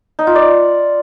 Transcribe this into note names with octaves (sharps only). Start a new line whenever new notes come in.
D#4
F4
D5